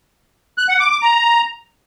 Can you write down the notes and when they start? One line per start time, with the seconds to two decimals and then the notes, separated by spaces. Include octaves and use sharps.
0.58 F#6
0.69 F#5
0.80 D6
0.91 D6
1.02 A#5